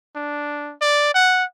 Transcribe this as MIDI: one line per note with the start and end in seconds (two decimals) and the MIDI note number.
0.16 0.73 62
0.81 1.12 74
1.15 1.45 78